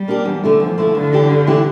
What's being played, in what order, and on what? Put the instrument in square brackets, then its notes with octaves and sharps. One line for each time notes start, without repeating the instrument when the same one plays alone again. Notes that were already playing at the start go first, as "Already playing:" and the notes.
Already playing: [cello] G3
[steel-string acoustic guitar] A#3 D4 G4
E2
D3 A3 E4
[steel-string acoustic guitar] E2 [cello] F3
[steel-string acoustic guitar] D3 A3 E4
[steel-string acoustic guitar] G2 [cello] D3
[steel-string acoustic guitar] E3 A3 E4 G4
G2
E3 A3 E4 G4